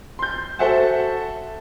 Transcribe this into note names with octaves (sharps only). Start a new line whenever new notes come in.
C6 G6
F#4 A4 C5 E5 F#5 A5